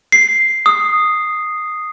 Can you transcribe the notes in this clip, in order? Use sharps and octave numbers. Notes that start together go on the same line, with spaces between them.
C7
D#6